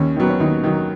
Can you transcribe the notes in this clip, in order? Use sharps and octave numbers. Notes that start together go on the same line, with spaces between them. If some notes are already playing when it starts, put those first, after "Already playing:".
Already playing: D#2 C#4
D#3 F#3 B3
C#4
D#2 D#4
D#3 F#3